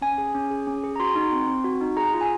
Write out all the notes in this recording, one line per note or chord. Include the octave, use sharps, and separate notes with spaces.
C#4 G#5
G#4
C#4
G#4
C#4
G#4
A#5
F#4 C6
D#4
C4
C4
F#4
D#4
G#4 A#5
F4
G#5